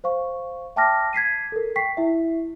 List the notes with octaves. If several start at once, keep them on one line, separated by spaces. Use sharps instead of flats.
C5 F5 C#6
E5 G5 A5 D6 F6 A#6
G#6 B6 C7 D#7
A4 A#4
G5 C#6 B6 C7
E4 E5